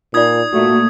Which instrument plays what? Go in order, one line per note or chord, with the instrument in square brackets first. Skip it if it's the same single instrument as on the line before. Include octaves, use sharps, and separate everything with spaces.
[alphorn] A#2 [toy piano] D#4 F4 D5 [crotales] D#6 G#6
[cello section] A#2 A3 [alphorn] F#4